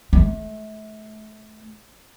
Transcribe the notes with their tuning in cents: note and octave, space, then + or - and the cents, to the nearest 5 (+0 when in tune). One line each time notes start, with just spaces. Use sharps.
A3 -35